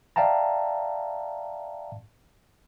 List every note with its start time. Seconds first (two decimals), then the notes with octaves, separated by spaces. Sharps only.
0.16 D5 E5 F5 G5 A5 A#5